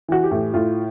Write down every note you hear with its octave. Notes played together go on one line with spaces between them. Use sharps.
E3 F#4
G4
A2
A2 F4